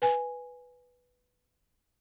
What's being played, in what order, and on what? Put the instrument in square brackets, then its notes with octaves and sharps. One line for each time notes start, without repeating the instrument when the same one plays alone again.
[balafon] B4 G#5